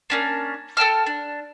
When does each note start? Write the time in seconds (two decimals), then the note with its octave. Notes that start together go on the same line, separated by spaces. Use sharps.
0.10 A#3 C#4 D4
0.77 A4 G5 A5 F6
1.06 D4